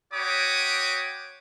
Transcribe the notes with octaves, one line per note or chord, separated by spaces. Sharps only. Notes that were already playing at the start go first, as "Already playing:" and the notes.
F#4 C#5 G5 B5 D6 D#6